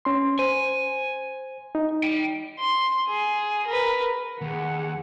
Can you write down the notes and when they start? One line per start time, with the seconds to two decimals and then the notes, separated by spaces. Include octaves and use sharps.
0.05 C#4 C6
0.39 C5 G#5
1.75 D#4
2.03 G5 B5
2.59 C6
3.07 G#4
3.67 A#4 B4
4.41 D#2 G#4 F#5